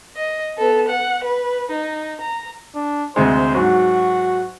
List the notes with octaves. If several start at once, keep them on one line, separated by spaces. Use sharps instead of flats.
D#5
B3 A4
F#5
B4
D#4
A#5
D4
D2 C3 G#3 C5
G#2 F#3 F#4